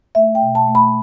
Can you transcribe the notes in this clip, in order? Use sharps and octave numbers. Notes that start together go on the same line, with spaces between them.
A3 E5
G5
B2
A5
A3
B5